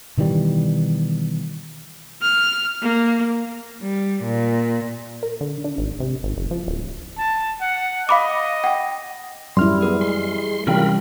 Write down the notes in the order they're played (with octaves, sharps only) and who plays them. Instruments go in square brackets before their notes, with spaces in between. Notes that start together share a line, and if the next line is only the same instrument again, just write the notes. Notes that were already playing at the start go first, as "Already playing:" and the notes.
[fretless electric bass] B2 D#3 E3 G3
[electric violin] F6
A#3
[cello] G3
A#2
[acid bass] A#4
D3
D4
G#1
C3
G#1
F#1
F3
D1
[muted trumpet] A5
F#5
[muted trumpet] D#5 [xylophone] F5 B5 D6
[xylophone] F#5 G5
[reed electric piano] F#2 F6 [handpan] G3 E4 [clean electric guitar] C6
[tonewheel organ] B3 [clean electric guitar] G#4
[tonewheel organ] G#3 C6
[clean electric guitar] C3 C#4 G5 [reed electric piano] E3 G3 [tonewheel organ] F4 A#4 B5